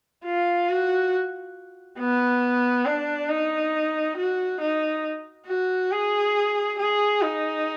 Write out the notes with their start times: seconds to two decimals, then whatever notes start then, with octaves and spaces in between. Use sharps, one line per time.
0.25 F4
0.69 F#4
1.98 B3
2.86 D4
3.29 D#4
4.17 F#4
4.61 D#4
5.47 F#4
5.91 G#4
6.79 G#4
7.22 D#4